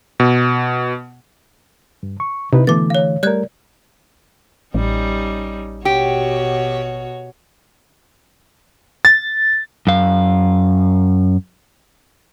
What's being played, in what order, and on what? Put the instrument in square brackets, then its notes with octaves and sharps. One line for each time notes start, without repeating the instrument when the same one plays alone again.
[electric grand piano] B2
[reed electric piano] G2
C#6
[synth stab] C3 [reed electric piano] D#4 E4 B4
[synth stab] B2 [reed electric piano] D3 E3 A3 [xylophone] D6 A6
[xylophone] C#5 F5
[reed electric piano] G3 A3 A#4 [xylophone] D5 F#6 G#6
[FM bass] A1 [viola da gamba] G3 C#4 D#4
[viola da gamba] B2 F#4 C#5 [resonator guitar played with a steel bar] G4
[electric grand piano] A6
[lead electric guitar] F#2 F5